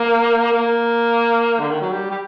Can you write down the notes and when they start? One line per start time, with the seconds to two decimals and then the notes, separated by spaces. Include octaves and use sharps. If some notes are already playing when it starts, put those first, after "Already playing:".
Already playing: A#3
0.53 A#3
1.60 D3
1.71 D#3
1.82 F#3
1.92 G3
2.11 G3